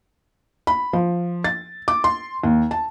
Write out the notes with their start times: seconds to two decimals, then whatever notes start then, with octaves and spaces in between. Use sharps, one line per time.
0.67 B5
0.93 F3
1.44 A6
1.88 D6
2.04 C6
2.44 D#2
2.71 A5